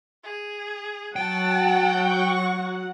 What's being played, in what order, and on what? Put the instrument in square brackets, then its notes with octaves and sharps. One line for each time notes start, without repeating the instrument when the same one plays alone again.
[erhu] G#4
[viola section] F#3 F#5 [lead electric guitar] G5 [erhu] A5
[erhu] C#6